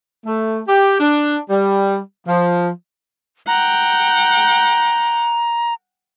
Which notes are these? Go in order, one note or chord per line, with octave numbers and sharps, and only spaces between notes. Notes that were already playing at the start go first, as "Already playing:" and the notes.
A3
G4
D4
G3
F3
F#5 G5 A#5